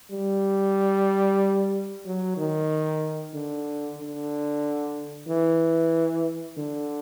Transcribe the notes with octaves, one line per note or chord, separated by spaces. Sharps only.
G3
F#3
D#3
D3
D3
E3
D3